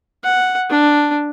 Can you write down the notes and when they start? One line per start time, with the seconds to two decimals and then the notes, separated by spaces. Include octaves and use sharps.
0.24 F#5
0.70 D4